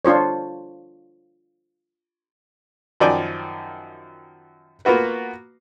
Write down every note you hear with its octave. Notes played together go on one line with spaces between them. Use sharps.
D4 F4 C5 C#5
F#2 D#3 F3 D5 G5 G#5
A#3 B3 F4 F#4 B4